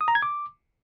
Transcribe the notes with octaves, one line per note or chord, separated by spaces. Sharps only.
D#6
A#5
G#6
D6